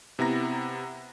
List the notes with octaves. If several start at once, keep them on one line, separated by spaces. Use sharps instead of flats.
C3 B3 E4 A#5 A#6